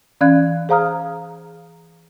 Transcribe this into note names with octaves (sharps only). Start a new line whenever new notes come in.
E3 C#4 D5 F5 F#6 G#6
G#4 C5 F5 A#5 D#6 F6